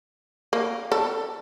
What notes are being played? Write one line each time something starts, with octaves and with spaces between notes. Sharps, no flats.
A#3
A4